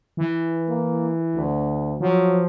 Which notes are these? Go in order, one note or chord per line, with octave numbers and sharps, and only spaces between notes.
E3
A#3
D2
F3 F#3